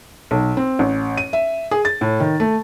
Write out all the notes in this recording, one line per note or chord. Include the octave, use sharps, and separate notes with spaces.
B1
C4
A1
D#7
E5
G#4
A6
A2
D#3
A3